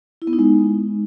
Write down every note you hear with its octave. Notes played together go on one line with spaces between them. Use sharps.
E4
B3
D#4
G#3